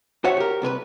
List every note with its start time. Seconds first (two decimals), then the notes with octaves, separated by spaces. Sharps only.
0.24 F#4 C5 C#5 E5 F#5
0.37 G4 A#4
0.62 C2 C3 A#4 B4